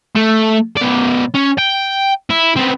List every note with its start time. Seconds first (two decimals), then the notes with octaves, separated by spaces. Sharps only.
0.16 A3
0.77 B2 D5
1.34 C#4
1.58 G5
2.30 E4
2.56 B3 C4